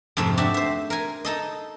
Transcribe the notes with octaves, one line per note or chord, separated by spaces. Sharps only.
F2 G#2 C3 F3 A3
D4 F#4 G4 E5
C5 E5
A#4 G#5
D#4 A4 D#5